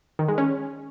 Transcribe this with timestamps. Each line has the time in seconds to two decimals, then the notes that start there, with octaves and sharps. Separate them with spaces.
0.19 D#3
0.28 G#3
0.38 C#4